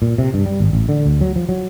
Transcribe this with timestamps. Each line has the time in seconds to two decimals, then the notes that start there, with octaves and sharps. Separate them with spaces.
0.02 A#2
0.18 C3
0.34 G2
0.46 G3
0.60 G#1
0.73 A1
0.89 D3
1.06 D2
1.21 F#3
1.36 F3
1.49 F#3